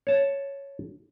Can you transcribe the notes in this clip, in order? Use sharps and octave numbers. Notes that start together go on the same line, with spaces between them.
C#5 A5